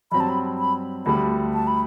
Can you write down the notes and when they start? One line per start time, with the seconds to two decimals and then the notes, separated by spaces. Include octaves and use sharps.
0.11 G2 F#3 C4 F#4 B5
0.20 A5
0.29 B5
0.59 B5
1.06 D2 D3 G3 B5
1.54 A5
1.67 B5